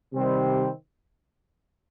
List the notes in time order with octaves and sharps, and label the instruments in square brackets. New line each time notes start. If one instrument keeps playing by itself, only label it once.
[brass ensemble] C3 D#3 G3 C4